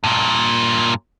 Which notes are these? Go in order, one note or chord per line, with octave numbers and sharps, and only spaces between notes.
G2 A#2